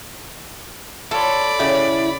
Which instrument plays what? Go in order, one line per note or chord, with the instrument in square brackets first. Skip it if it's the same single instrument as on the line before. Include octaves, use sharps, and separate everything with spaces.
[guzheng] F4 C#5 [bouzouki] A4 [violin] D5 B5
[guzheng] C#3 F#4 G4 [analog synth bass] E4